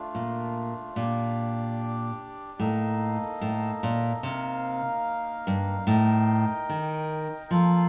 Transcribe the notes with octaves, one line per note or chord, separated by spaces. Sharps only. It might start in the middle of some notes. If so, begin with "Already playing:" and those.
Already playing: A3 D4 F4
A#2
A#2 D4 G4 D5
A2 A#3 D#4 A4 D#5
A2
A#2
C3 A#3 D#4 A#4 F5
G2
A2 D#4 A#4 D#5 G5
D#3
F3 A#3 F4 A4